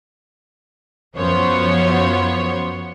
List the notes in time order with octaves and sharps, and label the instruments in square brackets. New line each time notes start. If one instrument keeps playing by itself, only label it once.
[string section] F#2 F3 B3 C5 C#5